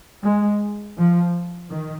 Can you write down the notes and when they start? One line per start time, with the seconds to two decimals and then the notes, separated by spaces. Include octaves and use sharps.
0.23 G#3
0.97 F3
1.69 D#3